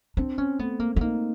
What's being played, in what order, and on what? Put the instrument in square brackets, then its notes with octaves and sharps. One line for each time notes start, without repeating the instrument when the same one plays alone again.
[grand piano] C4 [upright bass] D4
[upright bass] C#4
[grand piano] A3 [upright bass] B3
[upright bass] A#3
B3
[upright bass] A#3 [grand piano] D#4